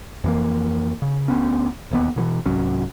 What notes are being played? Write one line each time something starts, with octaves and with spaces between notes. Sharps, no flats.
F2 E3 A#3
C#3
D2 B3 C#4
E1 D#2 B3
B2 D#3 E3
C2 G#2 F#3 C#4